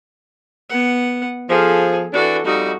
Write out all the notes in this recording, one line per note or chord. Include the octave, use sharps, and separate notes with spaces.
B3 F#5
F3 G#4 A4
E3 D4 F#4 A4
F2 G3 D#4 F#4